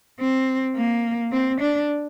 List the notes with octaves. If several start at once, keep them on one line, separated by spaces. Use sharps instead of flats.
C4
A#3
C4
D4